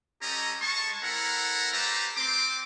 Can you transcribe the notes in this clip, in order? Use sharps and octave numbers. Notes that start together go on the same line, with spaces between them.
G3 C#4 G4 A4 D#5 A#5
G#3 A5 C#6
C4 E4 A4 A#4 F#5 A#5
A3 G4 B4 C5 A5 A#5
C4 C6 D6